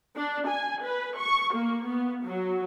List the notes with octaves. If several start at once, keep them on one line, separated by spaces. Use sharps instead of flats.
D4
G#5
B4
C#6
A#3
B3
F#3